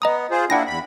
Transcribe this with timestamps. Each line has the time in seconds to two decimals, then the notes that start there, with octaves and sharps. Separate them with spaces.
0.02 B3 D#5 A#5 D#6
0.31 F4 G#4 C5
0.50 A#3 D4 E4 F#5 G5 A#6
0.67 E2 B5